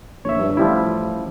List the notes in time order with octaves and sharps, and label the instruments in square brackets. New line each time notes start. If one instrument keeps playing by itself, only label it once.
[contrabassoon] A#1 [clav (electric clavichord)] C#5 E5
[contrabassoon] G2
[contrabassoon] A1 [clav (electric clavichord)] F3 G3 E4